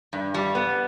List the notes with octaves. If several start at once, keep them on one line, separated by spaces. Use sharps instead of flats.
G2
G3
B3